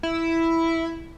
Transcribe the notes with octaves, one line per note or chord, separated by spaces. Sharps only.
E4